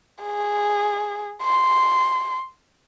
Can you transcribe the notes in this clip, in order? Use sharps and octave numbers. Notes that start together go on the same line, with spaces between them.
G#4
C6